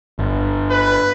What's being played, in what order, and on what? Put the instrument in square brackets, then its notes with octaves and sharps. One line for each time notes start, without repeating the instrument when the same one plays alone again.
[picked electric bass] G1
[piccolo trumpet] B4